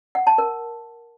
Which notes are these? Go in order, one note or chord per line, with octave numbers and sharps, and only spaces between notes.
F#5
A5
A#4